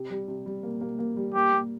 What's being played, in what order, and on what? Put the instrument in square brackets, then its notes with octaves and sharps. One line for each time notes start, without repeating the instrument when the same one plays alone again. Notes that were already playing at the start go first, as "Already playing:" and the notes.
Already playing: [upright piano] C3
G3
C3
G3
A#3
A#3
A#3
G3
[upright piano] A#3 [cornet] G4
[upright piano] A#3